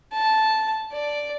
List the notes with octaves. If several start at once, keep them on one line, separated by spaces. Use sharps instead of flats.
A5
D5